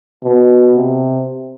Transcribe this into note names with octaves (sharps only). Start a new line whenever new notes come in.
B2
C3